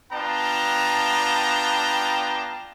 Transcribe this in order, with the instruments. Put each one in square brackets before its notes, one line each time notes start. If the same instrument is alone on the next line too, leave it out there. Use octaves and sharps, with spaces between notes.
[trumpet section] B3 D4 F4 G5 A5 A#5